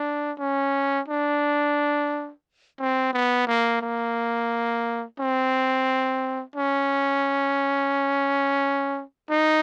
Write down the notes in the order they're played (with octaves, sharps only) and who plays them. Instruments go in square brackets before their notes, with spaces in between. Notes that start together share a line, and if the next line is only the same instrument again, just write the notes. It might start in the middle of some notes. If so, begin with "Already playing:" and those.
Already playing: [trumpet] D4
C#4
D4
C4
B3
A#3
A#3
C4
C#4
D#4